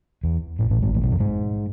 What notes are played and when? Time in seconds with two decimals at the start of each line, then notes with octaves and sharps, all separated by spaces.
0.24 E2
0.59 A1 A2
0.70 A1 A2
0.82 G#1 G#2
0.94 A1 A2
1.02 B1 B2
1.11 F2 F3
1.20 G#2 G#3